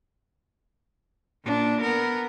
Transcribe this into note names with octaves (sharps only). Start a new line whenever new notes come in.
A#2 D4
B3 A#4